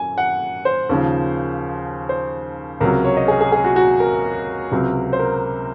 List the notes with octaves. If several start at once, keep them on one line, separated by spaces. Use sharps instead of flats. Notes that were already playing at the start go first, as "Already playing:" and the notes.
Already playing: F#2 G#5
F#5
C5
D#2 C#3 F3
C5
C#2 C3 F#3 A#4
C#5
D#5
G#4
G#4
G#4
F#4
F#4
A#4
C#2 C3 F#3
C5
A#4